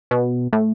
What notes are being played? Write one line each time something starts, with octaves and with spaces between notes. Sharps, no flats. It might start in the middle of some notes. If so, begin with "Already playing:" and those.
B2
A2